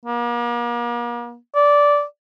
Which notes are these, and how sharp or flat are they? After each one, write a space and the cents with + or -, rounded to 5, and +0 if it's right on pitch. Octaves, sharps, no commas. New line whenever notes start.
A#3 +40
D5 -10